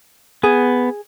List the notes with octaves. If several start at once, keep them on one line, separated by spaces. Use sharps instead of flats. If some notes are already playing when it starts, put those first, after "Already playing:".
B3 G#4